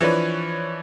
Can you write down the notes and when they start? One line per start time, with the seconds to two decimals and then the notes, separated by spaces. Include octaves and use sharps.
0.01 E3 F3 D4 B4 C#5